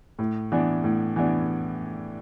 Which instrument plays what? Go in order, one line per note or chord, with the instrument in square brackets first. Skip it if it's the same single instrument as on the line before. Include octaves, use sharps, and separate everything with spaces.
[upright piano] A2
E3 B3 D4
A2
E3 B3 D4